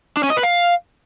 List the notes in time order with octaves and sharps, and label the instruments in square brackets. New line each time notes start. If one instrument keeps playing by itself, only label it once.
[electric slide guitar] D4
C#4
D#5
B4
F5